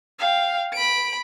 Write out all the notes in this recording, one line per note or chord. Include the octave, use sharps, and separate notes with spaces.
F5 G5
B5 D7